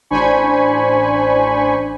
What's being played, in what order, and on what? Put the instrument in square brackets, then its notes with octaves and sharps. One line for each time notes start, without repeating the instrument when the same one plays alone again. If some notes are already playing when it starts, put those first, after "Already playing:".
[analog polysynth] A1 D4 C5 G#5 B5 C#6